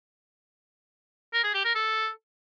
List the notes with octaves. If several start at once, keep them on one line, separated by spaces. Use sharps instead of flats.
A#4
G#4
G4
A#4
A4